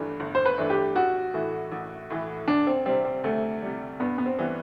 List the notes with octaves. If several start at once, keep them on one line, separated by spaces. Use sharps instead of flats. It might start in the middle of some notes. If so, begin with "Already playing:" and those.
Already playing: G1 G2 E3 A3 D4
G1
C5
B4
G2 E3 A3 D4
G4
A1 F#4
A2 E3 A3
A1
A2 E3 A3
D2 D4
C4
C3 G3 C4
C4
D2 A3
C3 G3
G2 B3
B3
C4
E3 G3 B3